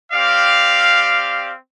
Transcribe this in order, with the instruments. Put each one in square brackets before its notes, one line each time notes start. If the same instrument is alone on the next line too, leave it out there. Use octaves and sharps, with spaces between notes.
[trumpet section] C4 G4 D5 F5